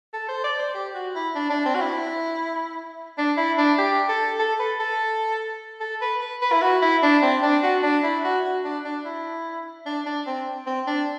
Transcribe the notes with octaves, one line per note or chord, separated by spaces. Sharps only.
A4
C5
D5
C5
G4
F#4
E4
D4
D4
C4
F#4
E4
D4
E4
D4
G4
A4
A4
B4
A4
A4
B4
B4
B4
E4
F#4
E4
D4
C4
D4
F#4
D4
E4
F#4
F#4
D4
D4
E4
D4
D4
C4
C4
D4